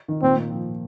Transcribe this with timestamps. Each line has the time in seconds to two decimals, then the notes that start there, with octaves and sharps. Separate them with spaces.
0.08 D#3
0.23 A#2 C4
0.36 A#3
0.51 F3